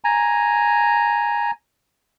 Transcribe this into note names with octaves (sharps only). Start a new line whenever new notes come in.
G#5 A#5